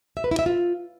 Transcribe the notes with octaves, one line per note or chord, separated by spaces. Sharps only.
E5
B4
E4
E5
F4